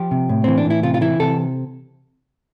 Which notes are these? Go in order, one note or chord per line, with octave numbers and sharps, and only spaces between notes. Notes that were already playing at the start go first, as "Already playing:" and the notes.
Already playing: F3 G4
C3
A2
E3 C4
D4
A2 E4
C3 F4
F4
E3 E4
C3 A4